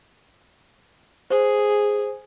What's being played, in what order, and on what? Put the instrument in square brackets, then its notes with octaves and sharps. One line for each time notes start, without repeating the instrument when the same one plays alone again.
[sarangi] G#4 [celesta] C5